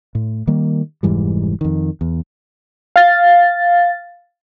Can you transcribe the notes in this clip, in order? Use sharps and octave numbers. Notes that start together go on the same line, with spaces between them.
A2
D#3 G3 A#3
F1 G#2 E3 G3
F2 D#3
E2
F5 A6